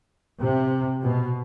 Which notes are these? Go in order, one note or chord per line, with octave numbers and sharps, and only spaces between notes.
C3
B2